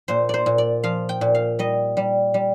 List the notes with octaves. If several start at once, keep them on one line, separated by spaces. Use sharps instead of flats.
A#2 C5
C5 D5
A#2
D5
F3 F5
G5
A#2
F5
G3 D#5
G3
G3